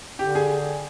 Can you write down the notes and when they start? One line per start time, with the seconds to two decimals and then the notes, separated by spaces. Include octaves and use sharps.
0.19 D3 G4
0.35 G#4